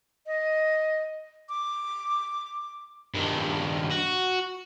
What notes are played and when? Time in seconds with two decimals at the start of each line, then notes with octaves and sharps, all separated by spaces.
0.27 D#5
1.49 D6
3.15 G2 D#3
3.91 F#4